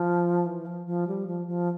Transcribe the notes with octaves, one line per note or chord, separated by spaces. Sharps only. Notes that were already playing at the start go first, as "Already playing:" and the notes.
Already playing: F3
E3
F3
F3
G3
F3
F3